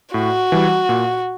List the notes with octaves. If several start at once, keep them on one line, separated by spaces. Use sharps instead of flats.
A2 F#4
E3 G3
A#2